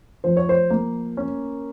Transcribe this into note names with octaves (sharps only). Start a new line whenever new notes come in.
F3 C5
C#5
C5
A#3
C#4